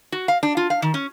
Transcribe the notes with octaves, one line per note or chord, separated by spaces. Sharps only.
F#4
F5
D4
F4
F5
D#3
C#4